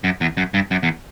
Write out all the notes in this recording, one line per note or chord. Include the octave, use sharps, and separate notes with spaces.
F#2
E2
F#2
G2
F#2
E2